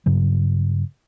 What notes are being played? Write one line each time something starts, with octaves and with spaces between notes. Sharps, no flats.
G2 C#3 F#3